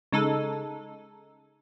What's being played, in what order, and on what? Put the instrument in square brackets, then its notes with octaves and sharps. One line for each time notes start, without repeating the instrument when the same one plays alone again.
[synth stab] C#3 G#3 D#4 A4